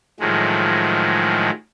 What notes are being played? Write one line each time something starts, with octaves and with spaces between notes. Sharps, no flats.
A2 D#3 F3 F#3 G#3